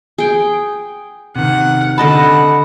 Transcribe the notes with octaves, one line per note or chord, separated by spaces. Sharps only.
G#4 G5
C3 D#3 F#5
D3 D#5 F#5 A5 B5